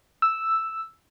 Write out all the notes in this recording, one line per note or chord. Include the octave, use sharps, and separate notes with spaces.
E6